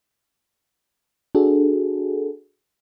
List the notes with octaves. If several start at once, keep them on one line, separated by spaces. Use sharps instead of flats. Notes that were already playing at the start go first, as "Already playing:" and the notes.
D4 F#4 G#4 A4